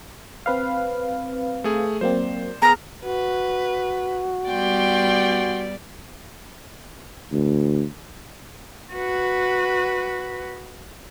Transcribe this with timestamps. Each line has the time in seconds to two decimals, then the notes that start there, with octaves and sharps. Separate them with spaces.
0.46 C4 B4 F5
1.64 A3 G#4
2.01 F#3 A#3 C4 C5 D5
2.62 B3 G#4 A#5 F6
3.05 F#4 B4
4.49 G3 B3 D5 G5 C6
7.33 D2
8.93 F#4 B4